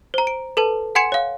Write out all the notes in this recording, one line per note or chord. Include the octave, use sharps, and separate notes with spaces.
C5 A#5
D7
A4 B4 A5
F#5 G#5 C6 G#6 C#7 E7
C#5 F5